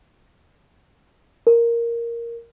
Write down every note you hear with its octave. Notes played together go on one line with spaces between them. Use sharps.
A#4